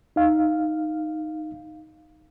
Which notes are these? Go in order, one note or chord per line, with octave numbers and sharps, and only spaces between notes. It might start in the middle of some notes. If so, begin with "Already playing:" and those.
D#4 F5